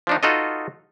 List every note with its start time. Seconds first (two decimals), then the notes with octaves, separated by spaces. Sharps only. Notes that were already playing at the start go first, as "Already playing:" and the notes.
0.07 F3 D4 D#4
0.23 D#4 F4 F#4 A4 B4 D#5